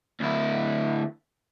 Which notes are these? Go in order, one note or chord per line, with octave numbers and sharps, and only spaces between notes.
D2 E4